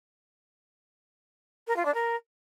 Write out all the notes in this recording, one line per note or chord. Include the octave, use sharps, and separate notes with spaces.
A#4
F4
D4
A#4